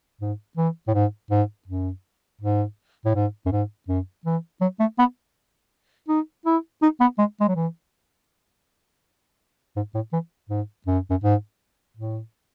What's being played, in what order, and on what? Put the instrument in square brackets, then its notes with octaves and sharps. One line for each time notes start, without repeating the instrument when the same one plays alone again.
[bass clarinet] G#2
E3
A2
G#2
G#2
F#2
G#2
A2
G#2
F#2
G#2
F#2
E3
F#3
A3
B3
D#4
E4
D#4
B3
G#3
G#3
F#3
E3
G#2
A2
E3
G#2
F#2
F#2
G#2
A2